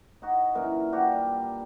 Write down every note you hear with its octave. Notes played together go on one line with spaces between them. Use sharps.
D#4 F#4 D#5
F#2 A#2 E3 A#4
D4 F#4 G4 D5
G3